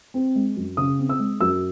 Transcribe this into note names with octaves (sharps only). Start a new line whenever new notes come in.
C4
G#3
F#2
C#3 D#6
C4
E6
G#3
F#2 E6